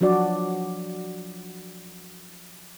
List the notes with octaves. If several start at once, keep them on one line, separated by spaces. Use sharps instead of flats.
F3 F#3 D4 F#4 D5